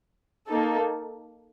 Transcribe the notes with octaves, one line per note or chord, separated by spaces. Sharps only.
A#3 D#4 A4